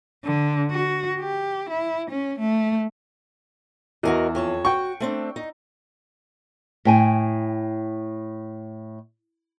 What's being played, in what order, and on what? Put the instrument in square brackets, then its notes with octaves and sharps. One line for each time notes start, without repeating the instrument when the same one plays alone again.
[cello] D3
F#4
G4
E4
C#4
A3
[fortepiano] E2 [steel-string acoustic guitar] F#4 A#4 D#5
[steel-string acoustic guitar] F2 C#5 A5
[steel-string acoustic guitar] F#4 [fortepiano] G5 C#6
[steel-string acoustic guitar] A3 C4 D4
D#4
[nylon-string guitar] A2 G5 G#5